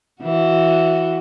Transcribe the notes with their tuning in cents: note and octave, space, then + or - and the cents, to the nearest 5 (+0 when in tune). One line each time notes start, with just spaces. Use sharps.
E3 +0 F#4 +0